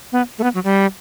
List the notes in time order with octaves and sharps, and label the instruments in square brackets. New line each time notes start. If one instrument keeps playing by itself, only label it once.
[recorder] B3
A3
B3
F#3
G3